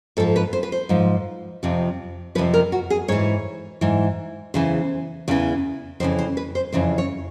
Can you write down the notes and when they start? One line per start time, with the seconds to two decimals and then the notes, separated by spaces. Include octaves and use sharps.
0.17 G#2 F3 A4
0.36 B4
0.53 C5
0.63 B4
0.72 C5
0.89 G#2 F3
1.63 F2 C3 F3
2.35 F3 B4
2.38 F2 C3
2.54 A#4
2.72 F#4
2.90 G#4
3.08 G#2 E3 C#5
3.81 G#2 E3
4.54 E2 C#3 E3 C5
5.28 E2 C#3 E3
6.00 F2 C5
6.03 C#3 E3
6.19 C5
6.37 B4
6.55 C5
6.72 F2 C#3 E3 C5
6.98 C#5